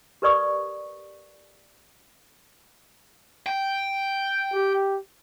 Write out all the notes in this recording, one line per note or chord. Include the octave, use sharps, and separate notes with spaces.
G4 A#4 B4 D5 C#6 D#6
G5
G4